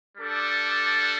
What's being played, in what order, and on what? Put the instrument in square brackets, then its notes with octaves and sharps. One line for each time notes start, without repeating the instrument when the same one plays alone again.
[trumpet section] G3 D4 A4